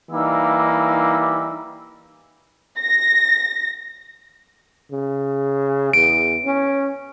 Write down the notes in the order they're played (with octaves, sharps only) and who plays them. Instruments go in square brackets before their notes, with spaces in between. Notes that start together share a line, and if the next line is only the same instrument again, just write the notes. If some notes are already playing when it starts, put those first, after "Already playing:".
[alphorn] E3 [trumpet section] G3 A#3 [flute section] D#4 E6
[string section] A#6
[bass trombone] C#3
[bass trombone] E2 [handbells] D7
[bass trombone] C#4